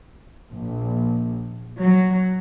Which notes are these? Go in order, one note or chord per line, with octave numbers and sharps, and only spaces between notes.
A#1
F#3